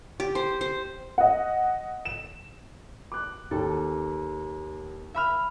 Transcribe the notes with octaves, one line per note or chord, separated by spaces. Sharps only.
G4
C5
C5
D#5 F#5
E7
D6 F#6
D#2 A4
E5 B5 F6